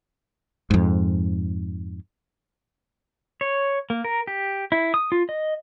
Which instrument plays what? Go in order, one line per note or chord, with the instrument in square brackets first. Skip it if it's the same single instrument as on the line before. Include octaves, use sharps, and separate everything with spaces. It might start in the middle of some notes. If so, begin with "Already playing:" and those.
[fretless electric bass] F2 G#2
[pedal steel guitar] C#5
A#3
A#4
G4
E4
D#6
F4
D#5